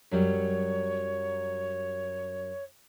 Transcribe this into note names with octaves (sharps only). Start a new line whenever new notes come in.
F#2 F#3 G3 C#5